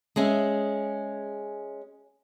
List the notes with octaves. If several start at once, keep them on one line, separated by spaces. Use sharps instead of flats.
G#3 C#4 G#4 E5